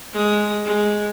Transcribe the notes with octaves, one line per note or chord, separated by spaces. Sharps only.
G#3 D#6
G#3